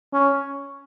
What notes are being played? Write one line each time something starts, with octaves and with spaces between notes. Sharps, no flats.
C#4